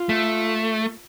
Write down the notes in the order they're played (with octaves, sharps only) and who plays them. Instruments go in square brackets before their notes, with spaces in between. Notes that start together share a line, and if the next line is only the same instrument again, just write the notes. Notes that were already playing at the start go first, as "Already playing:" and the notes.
Already playing: [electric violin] F4
[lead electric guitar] A3